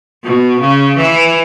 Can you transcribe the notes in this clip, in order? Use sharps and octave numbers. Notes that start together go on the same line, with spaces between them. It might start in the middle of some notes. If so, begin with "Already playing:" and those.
B2
C#3
E3